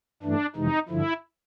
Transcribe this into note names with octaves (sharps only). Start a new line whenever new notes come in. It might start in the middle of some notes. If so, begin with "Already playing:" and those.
G2 E3 A3 D4
F2 C3 E3 G#3 D#4
G2 D3 F3 E4